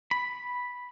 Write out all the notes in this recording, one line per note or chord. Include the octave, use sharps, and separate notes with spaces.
B5